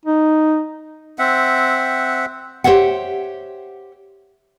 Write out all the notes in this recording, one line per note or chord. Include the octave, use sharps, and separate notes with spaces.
D#4
C4 E5 F#5
G4 C5 C#5 E5 F#5